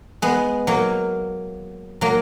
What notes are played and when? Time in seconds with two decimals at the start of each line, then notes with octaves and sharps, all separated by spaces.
0.22 G#3 B3
0.67 F#3 A#3
2.01 F#3 A#3